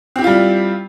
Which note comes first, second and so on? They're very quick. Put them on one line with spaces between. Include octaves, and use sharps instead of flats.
C4 G4 E4 F4 G3